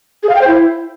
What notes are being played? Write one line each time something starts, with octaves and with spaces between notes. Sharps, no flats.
G#4
F5
G5
C5
E4